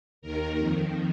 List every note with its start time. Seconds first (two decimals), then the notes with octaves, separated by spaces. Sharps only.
0.22 D#2 D#3 A#4
0.58 F2 D#3